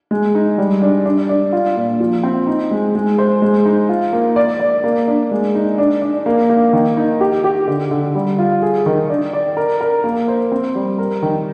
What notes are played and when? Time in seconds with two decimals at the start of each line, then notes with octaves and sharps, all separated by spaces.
0.11 G#3
0.35 D#4
0.58 G3
0.82 D4
1.06 D4
1.29 D4
1.53 F4
1.76 A#2
2.00 F3
2.23 C4
2.47 D#4
2.71 G#3
2.95 G#3
3.18 C5
3.42 G#3
3.66 D#4
3.89 F4
4.13 A#3
4.36 D5
4.60 D5
4.84 A#3
5.08 D4
5.31 G#3
5.55 D#4
5.78 D4
6.02 D4
6.26 A#3
6.50 A#3
6.73 D#3
6.97 D#4
7.21 G4
7.44 G4
7.68 D3
7.91 D3
8.15 G3
8.39 F4
8.62 G#4
8.86 D#3
9.10 D4
9.33 D5
9.57 A#4
9.81 A#4
10.04 A#3
10.28 C5
10.52 C4
10.75 G3
10.98 A#4
11.22 D#3